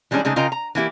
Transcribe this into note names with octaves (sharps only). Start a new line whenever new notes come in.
E3 G3 G#3 C#4 D4
C#3 G#3 A3 D#4
C#3 F4 A#4 D#5 G5 A#5
A#5
E3 A#3 E4 G4